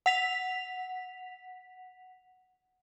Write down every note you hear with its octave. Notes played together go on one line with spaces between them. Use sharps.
F#5 B6 F7